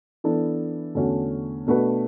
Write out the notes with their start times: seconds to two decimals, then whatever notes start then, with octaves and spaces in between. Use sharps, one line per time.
0.24 E3 B3 D4 A4
0.95 E2 D3 A3 C#4 F#4
1.67 B2 A3 D4 F#4 B4